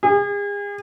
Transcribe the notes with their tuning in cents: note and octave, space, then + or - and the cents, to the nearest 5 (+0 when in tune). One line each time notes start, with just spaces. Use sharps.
G#4 -40